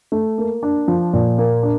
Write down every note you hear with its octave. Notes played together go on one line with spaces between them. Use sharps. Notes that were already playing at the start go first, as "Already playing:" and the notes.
A3
A#3
D4
F3
A#2
A#3
D4